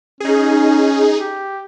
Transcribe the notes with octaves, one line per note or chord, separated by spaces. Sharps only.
C#4 D#4 G#4
G4